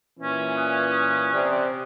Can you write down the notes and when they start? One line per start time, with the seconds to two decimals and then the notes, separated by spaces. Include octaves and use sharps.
0.19 A#2 E3 C#4
0.56 D#6 F#6
1.31 C3 C5 D5